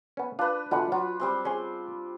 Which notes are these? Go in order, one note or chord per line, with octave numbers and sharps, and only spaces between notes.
B3 C#4
D4 F4 B4
B2 D3 E3 F4 F#5
F#3 F4
G3 C4 C6
C#4 G#4 C6